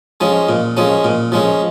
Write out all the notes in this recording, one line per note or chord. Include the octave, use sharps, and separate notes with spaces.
F3 G#3 C#4
A#2
F3 G#3 C#4
A#2
F3 G#3 C#4